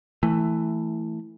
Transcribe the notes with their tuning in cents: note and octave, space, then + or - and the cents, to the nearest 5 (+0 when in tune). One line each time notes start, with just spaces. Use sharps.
E3 +0 A3 +10